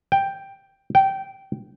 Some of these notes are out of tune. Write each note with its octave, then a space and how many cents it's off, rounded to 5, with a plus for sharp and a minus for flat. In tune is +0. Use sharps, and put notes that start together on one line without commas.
G5 +5
G5 -15